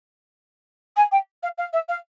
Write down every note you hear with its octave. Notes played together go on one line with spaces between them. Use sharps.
G#5
G5
F5
F5
E5
F5